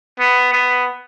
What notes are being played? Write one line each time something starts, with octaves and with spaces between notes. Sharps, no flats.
B3
B3